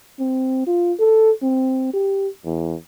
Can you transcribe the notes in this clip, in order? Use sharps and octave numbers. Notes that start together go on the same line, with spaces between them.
C4
F4
A4
C4
G4
E2